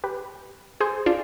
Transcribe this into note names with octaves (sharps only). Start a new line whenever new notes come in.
G4 B4
G#4 C5
D4 F4